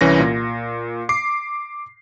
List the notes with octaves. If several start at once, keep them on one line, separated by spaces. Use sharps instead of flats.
C2 E3 C#4 A#6
A#2
D6 C7